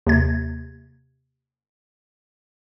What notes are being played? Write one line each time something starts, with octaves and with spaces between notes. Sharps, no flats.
D#2 C3 G#6